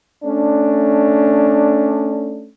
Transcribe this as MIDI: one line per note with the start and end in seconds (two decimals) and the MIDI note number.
0.24 2.48 57
0.24 2.48 61
0.24 2.48 62